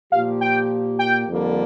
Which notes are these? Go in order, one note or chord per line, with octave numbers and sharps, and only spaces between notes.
A#2 F3 A#3 G4 F5
G5
G5
F2 D3 G3 A#3